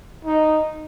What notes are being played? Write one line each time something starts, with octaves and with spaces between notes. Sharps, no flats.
D#4